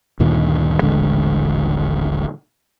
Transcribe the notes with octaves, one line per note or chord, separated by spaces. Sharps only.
D2 G2 A#2 D#3
D#1 A1 D3 G#3